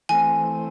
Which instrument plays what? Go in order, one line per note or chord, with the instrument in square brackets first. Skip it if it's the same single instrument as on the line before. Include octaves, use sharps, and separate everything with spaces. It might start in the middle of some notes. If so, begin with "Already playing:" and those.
[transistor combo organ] E3 A3 C4 [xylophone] G#5